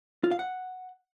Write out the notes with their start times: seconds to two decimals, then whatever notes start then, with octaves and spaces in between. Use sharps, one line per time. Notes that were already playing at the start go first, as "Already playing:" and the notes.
0.24 F4
0.31 F5
0.39 F#5